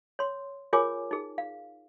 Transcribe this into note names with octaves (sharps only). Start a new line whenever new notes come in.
C#5 C6
F4 G#4 A#4 C#5 G#5 D6
D#4 G#4
F5